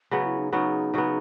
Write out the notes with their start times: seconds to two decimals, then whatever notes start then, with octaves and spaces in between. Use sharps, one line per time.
0.11 C#3 F#3 B3
0.24 E4
0.39 D#4
0.53 C#3 F#3 B3 D#4
0.94 C#3 F#3 B3